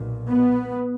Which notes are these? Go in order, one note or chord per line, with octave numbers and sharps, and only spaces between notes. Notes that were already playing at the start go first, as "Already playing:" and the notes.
Already playing: B1 A#2
B3